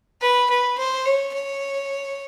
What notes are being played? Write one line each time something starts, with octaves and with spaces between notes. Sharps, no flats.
B4
B4
C5
C#5
C#5